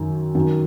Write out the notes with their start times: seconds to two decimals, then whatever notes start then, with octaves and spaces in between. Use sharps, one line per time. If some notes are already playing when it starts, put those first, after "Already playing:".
Already playing: F#2 D#3
0.35 F#2 D#3